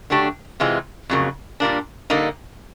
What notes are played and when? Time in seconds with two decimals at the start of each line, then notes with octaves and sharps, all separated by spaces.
0.10 D3 F#3 A3 D4 G4
0.60 C3 E3 G#3 C4 F4
1.09 F2 C#3 F#3 A#3
1.60 A#2 G3 A#3 D4
2.10 D3 G3 A#3 D#4